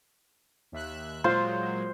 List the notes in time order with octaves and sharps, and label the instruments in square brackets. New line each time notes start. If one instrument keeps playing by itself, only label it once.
[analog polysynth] D#2 E5 F#6
[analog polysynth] A#2 F#3 G#3 [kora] F4 [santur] C5